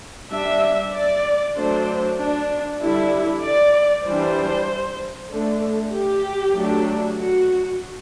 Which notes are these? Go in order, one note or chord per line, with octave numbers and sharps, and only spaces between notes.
G3 D4 E5
D5
F#3 A3 D4 C5
D4
D3 G3 D4 E4
D5
E3 G3 D4 C5
D3 A3 D4
G4
F#3 A3 D4
F#4